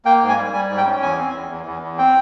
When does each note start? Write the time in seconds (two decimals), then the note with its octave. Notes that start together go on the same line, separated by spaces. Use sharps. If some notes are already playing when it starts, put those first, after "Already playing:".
0.05 A#3 G5
0.21 G#2
0.29 G#5
0.37 G3
0.53 G3 G#5
0.69 G#2
0.78 G5
0.86 C#4
1.02 E2 G#5
1.17 C4
1.34 E2
1.50 E2
1.66 E2
1.82 E2
1.98 C4 G5